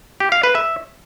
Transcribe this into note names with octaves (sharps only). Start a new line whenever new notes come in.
G4
F5
B4
E5